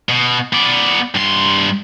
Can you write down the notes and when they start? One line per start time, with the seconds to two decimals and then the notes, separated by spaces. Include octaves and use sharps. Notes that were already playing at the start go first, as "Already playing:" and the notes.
0.09 B2
0.53 B3 D5
1.15 G2 C6